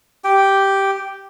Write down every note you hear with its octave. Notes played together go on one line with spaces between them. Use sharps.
G4 G5